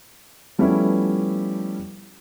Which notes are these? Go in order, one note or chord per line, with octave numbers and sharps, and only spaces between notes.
F3 G3 A3 B3 C#4 E4